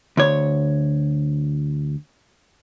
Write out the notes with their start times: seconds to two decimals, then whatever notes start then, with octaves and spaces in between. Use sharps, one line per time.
0.17 D2 C#5